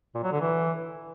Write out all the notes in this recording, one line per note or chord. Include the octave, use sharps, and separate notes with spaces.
A#2
F#3
D3
E3